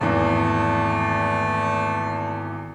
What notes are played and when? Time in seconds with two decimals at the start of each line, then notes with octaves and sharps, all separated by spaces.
0.01 G#1 E2 A3